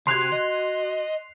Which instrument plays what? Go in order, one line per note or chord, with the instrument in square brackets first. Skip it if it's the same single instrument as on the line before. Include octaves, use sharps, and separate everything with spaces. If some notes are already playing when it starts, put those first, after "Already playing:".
[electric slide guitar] C3 [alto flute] F#4 [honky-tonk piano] C6 F#6 G#6 [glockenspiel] C7 F7
[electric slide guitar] D#5